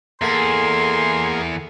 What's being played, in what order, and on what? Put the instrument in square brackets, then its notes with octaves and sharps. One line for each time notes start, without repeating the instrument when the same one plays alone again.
[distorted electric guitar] E2 [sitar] A3 [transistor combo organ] A#3 G#4 [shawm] C6